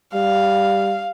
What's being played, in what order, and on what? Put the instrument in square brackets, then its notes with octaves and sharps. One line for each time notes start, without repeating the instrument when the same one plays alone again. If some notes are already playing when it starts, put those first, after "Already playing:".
[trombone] G3 [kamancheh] F5